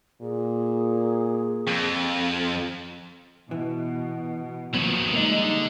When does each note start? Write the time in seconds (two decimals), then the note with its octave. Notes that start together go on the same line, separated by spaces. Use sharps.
0.22 A#2 G#4
1.67 F2
3.51 B2 E3
4.74 D#3 F3 F#3 A#3 B3
5.13 D3 G3 G#3 A#3 D#4 D#5